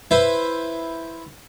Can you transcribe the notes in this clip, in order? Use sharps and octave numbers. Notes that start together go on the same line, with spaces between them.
E4 B4 C5